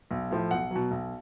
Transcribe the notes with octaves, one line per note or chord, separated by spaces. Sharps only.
B1
A2 F3
B1 F#5
B2 F#3
B1